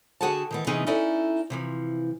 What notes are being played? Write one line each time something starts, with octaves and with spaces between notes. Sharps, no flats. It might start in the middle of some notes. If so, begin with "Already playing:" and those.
D3 F#4 G#4 F#5 G5 A5
D#3 E3 B3
C3 E3 B3 C#4 D#4 G#4
C#4 D#4 E4 A4 D5
C3 E3 F3